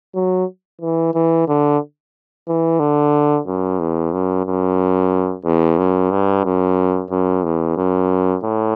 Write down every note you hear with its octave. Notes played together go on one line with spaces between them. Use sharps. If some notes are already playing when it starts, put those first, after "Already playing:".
F#3
E3
E3
D3
E3
D3
F#2
E2
F#2
F#2
E2
F#2
G2
F#2
F#2
E2
F#2
A2